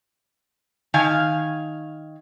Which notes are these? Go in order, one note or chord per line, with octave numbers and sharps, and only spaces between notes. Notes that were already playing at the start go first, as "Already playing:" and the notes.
D#3 F5 G#5